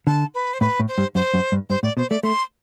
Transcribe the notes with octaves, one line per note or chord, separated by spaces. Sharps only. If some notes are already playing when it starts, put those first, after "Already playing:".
D3 A5
B4
C5
A2 B4
A2
C5
G2
F#2 C5
F#2
G2
G2 C5
A2 D5
B2 C5
A3 D5
A3 C6